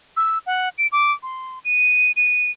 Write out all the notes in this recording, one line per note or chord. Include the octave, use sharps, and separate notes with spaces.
E6
F#5
D7
D6
C6
D#7
D#7